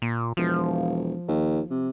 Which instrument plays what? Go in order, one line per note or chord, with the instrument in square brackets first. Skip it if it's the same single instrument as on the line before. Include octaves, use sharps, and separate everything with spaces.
[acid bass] A#2
[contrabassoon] E1 [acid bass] F3
[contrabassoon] D#2
C3